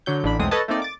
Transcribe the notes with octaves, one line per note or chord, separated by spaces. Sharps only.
D3 F#3 G6
A1 D4 B5
B1 E2 G#3 A3 C4 D#6
A4 B4 C#5 D#5 A5
A3 A#3 C4 D#4 D5
D6 A6